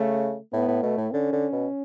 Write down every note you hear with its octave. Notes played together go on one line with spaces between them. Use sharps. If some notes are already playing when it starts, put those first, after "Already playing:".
Already playing: C#3 A3
A2 B3
A2
B2 A3
A2
D3 C#4
D3
B2